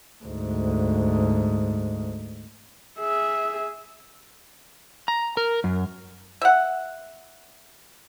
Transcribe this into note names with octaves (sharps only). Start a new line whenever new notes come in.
D2 G#2
G#4 E5
A#5
A#4
F#2
E5 F#5